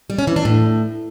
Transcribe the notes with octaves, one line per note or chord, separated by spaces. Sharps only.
G3
C#4
E3
D4
A2